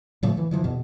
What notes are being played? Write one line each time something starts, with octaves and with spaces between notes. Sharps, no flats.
A2 C#3 F3 A3
E3
D3 E3 F3
E2 B2